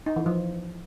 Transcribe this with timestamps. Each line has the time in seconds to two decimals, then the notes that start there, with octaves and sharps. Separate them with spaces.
0.06 D#4
0.16 E3
0.26 F3